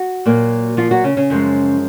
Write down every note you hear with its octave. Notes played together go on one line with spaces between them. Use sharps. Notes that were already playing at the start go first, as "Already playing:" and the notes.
Already playing: F#4
A#2 F#3 A#3
F3 F4
F#3 F#4
C#3 C#4
C#3 C#4
F#2 F3 G#3